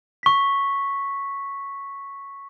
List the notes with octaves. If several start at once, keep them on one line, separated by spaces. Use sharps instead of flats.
C#6 B6